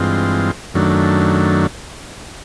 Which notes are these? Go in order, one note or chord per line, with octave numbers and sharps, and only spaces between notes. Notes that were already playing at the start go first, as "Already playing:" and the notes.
Already playing: G2 E3 G#3 C4 F4
F#2 D#3 F#3 A3 D4